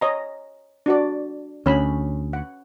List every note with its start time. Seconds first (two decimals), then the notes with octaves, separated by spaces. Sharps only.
0.01 C#5 D#5 A#5
0.86 D4 F#4 D5
1.66 D2 C#4 C#5 B5
2.33 F#5